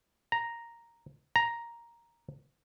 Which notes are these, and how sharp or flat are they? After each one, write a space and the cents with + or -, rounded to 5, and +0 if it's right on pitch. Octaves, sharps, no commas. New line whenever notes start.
A#5 +0
A#5 +5